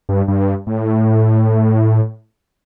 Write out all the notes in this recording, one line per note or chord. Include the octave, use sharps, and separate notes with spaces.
G2
G2
A2